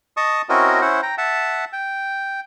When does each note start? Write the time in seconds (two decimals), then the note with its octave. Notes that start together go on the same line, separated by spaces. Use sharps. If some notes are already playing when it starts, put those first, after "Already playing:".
0.17 D#5 A5 C#6 D#6
0.49 C4 C#4 E4 F#4 A#4 D#5
0.81 C#4 E4 C5 F#5
1.03 G5 A#5
1.18 E5 F#5 A5
1.73 G5